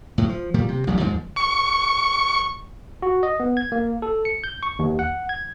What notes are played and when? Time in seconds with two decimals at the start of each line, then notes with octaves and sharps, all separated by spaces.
0.18 A2 F#3
0.29 F3
0.54 A#2 D#3 G3
0.68 C3
0.87 A1 F#3 G3
1.00 D#2 G#2 F3 G#3
1.36 C#6
3.02 F#4
3.23 D#5
3.40 B3
3.57 G#6
3.72 A#3
4.02 A4
4.25 C#7
4.44 G6
4.63 C#6
4.79 D#2
4.99 F#5
5.29 G#6